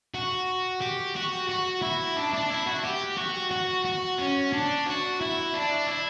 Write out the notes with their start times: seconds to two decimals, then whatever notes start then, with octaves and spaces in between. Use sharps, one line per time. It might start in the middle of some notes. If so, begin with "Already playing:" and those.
0.14 F#4
0.81 G4
1.15 F#4
1.49 F#4
1.82 E4
2.16 D4
2.34 D4
2.50 E4
2.67 F#4
2.84 G4
3.17 F#4
3.51 F#4
3.85 F#4
4.18 C#4
4.53 D4
4.86 F#4
5.21 E4
5.54 D4
5.87 E4